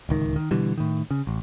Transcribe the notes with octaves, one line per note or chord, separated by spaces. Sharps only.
D1 C#2 D#3
D#3
B2 D3 E3 G3
A2 D#3
C#3
A1